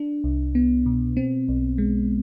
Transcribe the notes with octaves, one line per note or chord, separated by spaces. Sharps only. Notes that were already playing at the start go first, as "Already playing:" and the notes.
Already playing: D4
C2
B3
B2
C4
B1
G#3